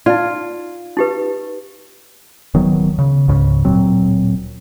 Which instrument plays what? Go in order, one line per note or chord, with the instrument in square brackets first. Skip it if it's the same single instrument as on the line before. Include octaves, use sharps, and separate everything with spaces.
[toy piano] D#4 D5 [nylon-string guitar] F4
[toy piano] D#4 G4 B4
[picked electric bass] D1 D#3 F#3 B3
C#3
C#2 G#2 C#3
D1 A#2 F#3 C4